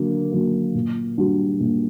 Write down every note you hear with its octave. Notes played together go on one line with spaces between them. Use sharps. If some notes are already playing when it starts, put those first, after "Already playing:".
Already playing: D3 F#3 A#3
F#3 A#3
A#2
G3 D4 F#4
A#2